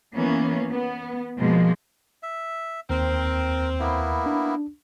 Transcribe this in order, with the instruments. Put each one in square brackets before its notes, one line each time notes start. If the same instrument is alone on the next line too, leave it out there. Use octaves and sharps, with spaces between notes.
[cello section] E3 A#3 B3 C#4
B3
B2 F3 G#3 A#3
[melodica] E5
[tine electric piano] D#2 [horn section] C4 [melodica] A#4
[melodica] A#3 B3 E4
[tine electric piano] D4